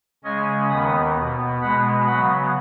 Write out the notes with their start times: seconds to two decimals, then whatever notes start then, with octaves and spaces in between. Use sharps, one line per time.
0.24 C#3 G#3 C#4 D#5 G#5
0.70 D#2 D#3 B3 B5 D#6
1.16 B2 B3
1.61 B2 G#3 B3 F#5 B5
2.06 C#3 F#3 B3 F#5 B5